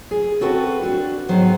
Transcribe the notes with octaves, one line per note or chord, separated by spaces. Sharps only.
G#4
C4 F#4 A4 B4 F#5
D4 F#4
G#2 D#3 F#3 B3 C5